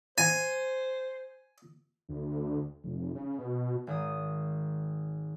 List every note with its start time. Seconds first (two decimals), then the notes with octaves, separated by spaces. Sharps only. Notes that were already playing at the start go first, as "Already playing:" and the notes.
0.18 C5 G#5
2.09 D2
2.84 F1
3.15 C#3
3.38 B2
3.87 G#1 D#3 D#6